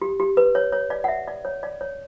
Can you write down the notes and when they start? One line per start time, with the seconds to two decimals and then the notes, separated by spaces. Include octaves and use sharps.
0.02 G4
0.20 G4
0.37 B4
0.55 C#5
0.72 C#5
0.90 D5
1.04 F#5
1.08 E5
1.27 D5
1.45 C#5
1.63 D5
1.81 C#5